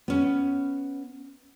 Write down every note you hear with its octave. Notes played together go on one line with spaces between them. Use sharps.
B3 C#4